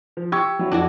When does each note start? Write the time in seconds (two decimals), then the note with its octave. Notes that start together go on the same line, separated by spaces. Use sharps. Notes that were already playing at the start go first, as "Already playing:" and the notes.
0.17 F3
0.32 G4 C#6 E6 G#6
0.59 F#3 E4
0.72 F2 D4 E4 F#4